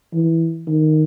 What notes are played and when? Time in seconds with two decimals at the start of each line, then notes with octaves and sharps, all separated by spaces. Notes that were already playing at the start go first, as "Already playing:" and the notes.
0.13 E3
0.67 D#3